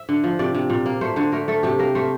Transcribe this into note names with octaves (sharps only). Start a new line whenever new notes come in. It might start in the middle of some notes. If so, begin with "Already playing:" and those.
Already playing: E5
D3
F3
C3 D5
C3
A#2
A#3
A3 C5
D3 C5
A3 A#4
A3 A4
C3 G4
A#3 A#4
A3 C5